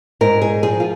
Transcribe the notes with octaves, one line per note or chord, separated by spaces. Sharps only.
G#2 A#4
G#4
F3 G#4
F4